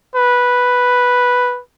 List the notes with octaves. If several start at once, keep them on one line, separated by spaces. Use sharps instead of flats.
B4